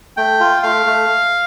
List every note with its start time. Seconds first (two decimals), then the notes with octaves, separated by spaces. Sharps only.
0.17 A3 G5
0.40 F4
0.63 A3 F5
0.86 A3